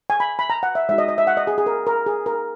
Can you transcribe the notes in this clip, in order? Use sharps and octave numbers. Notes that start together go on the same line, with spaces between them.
G#5
B5
B5
A#5
F#5
E5
G#3 D#4 F#4 E5
D#5
D#5
E5
F#5
D#5
G#4
G#4
A#4
A#4
G#4
A#4